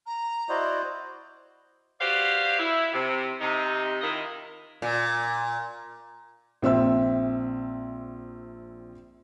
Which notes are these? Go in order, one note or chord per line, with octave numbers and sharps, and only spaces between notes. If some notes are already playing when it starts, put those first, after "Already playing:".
A#5
E4 F#4 C5 D5 D#5
F#4 G4 B4 C5 D5 F5
E4
C3
C3 D#4
D#3 E4 F4 A#4 D#5
A#2
A#1 C4 E5 E6